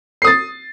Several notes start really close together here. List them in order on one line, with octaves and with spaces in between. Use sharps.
C7 D#6 A6